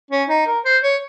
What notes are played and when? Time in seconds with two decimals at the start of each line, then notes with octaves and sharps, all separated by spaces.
0.11 C#4
0.29 D#4
0.47 A#4
0.65 C5
0.83 C#5